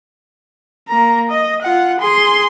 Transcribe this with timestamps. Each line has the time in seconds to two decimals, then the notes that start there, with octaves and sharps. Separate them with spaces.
0.88 A#3 A#5
1.30 D#5
1.62 F4 F#5
2.00 G#4 C6